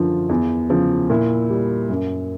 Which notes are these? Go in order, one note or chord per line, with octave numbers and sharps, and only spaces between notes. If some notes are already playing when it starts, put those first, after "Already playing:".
Already playing: F#2 D3 F3 F4
E2
C#3 F3
A#2 E4
G3
F#2